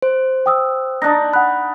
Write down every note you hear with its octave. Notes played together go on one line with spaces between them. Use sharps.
C5
G5 D#6 E6
D4 D#4 A#5 F#6 A#6
F#5 B5 F#6